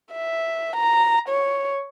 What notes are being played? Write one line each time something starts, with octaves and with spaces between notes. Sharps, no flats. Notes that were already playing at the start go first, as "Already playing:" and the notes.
E5
A#5
C#5